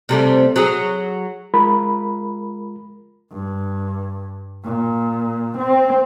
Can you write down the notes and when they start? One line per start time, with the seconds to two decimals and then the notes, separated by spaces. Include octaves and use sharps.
0.09 C3 G3 A3
0.56 F#3 G#4
1.54 G#3 F4 A#4 B5
3.32 G2
4.64 A#2
5.58 C4